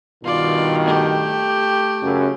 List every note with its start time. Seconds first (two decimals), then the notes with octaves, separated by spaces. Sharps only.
0.24 G2 B2 D#3 F4 D5
0.85 A3 G4
2.03 F#2 C#3